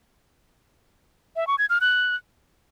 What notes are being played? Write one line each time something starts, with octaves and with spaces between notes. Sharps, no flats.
E5
C#6
G#6
F6
F#6